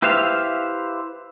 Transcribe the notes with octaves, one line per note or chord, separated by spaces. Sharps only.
E4 G4 B4 C5 E5 F5